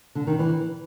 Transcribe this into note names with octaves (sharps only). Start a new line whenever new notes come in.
D3
D#3
E3